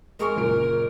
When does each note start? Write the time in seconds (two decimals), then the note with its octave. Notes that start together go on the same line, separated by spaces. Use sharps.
0.19 G#3 G#4 A#4 C#6
0.36 F#1 A#2 D7